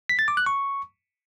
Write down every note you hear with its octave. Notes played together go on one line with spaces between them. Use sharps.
B6
A6
D6
F#6
C#6